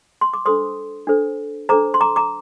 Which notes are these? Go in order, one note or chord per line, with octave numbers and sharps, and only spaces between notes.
C6
D6
D4 A4 C5 C6 D#6
D4 A4 C5
D4 A4 C5 A#5 D6
C6
A#5 D6
A#5 D6